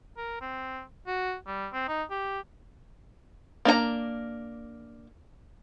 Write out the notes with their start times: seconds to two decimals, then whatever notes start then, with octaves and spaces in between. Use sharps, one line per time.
0.17 A#4
0.41 C4
1.07 F#4
1.47 G3
1.73 C4
1.88 D#4
2.10 G4
3.65 A#3 D4 C#5 A#5